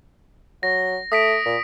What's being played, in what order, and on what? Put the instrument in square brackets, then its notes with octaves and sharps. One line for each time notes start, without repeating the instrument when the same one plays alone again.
[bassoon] F#3 [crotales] A#6
[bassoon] A3 [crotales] D#6 B6 D7
[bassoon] A#2